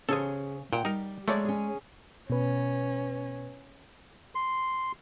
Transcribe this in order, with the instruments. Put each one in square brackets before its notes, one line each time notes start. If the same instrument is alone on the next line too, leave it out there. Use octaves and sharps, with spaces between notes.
[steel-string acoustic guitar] C#3 [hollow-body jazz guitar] C#4 G#4 C5 [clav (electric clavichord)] A4 G#5
[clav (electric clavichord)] A#2 [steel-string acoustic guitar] F#5 [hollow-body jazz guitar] G5
[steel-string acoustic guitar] G3 [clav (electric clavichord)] D#4 A#4
[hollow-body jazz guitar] G#3 C#5 D5 [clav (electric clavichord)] A3
[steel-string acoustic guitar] C#4 G#4
[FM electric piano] B2 B4 [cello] C#4
[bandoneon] C6